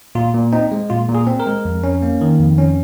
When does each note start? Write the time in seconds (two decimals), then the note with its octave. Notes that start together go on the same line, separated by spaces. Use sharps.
0.15 A#2 F4
0.34 A#2
0.52 C4 D#4
0.72 G#3
0.90 A#2 F4
1.09 A#2
1.15 G#4
1.27 C4
1.40 A#4
1.46 G#3
1.65 F2
1.84 C#4
2.02 A#3
2.21 D#3
2.40 F2
2.58 C#4